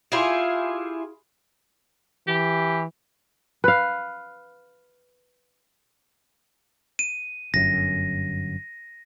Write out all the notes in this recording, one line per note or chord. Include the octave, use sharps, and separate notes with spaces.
E4 F4 G4 G#4
E3 G4
B4 F5
D#7
G1 F#2 A#6